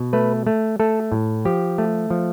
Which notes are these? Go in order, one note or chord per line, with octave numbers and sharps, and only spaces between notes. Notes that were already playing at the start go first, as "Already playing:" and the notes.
Already playing: B2
A3 B4
A3
A3 A4
A2
F3 G4
A3
F3